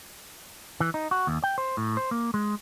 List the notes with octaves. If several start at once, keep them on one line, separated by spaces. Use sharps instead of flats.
E3
D#4
F#4
D#2
G5
C5
A2
C5
A#3
G#3